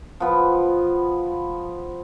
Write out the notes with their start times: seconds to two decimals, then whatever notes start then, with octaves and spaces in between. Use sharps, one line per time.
0.20 F3 B3